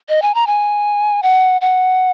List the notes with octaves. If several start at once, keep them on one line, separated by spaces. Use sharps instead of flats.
D#5
G#5
A#5
G#5
F#5
F#5